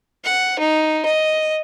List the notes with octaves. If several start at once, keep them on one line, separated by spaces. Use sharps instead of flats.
F#5
D#4
D#5